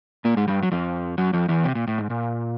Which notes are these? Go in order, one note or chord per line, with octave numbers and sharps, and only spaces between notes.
A#2 A#3
G#2 G#3
G2 G3
F#3
F2 F3
F#2 F#3
F2 F3
E2 E3
C3
A#2
A2
G#2
A#2